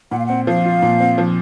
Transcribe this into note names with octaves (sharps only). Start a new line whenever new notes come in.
A#2 F#5
F5
C4 F#5
F3 F5
F4
A#2
C4
F3